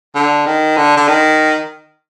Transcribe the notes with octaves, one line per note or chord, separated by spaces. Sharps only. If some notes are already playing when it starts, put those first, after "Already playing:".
D3
D#3
D3
D3
D#3